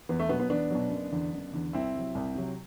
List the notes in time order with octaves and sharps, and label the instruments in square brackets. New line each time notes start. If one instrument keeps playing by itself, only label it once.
[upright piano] E2 B3
A3
B2 F#3 B3
B3
E2 B3 D4
B2 F#3
F#1
E2 D3
F#1
E2 D3
C2 C4 E4
C3 F#3
C2
C3 F#3